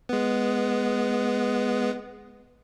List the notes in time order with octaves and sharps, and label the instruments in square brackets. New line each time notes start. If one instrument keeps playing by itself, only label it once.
[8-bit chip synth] G#3 B3